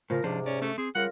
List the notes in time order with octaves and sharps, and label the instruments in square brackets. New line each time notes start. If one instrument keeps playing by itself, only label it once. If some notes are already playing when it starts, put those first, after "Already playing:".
[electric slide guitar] A2 C#3 [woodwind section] F3 A#4
[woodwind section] G#2 C3 [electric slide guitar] F3 C#4 D4
[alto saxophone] C#4 [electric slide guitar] D5
[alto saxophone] A3 [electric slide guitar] C#4
[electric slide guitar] C4 [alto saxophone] G#4
[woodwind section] C#3 F4 A#4 [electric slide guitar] G3 [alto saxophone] F#5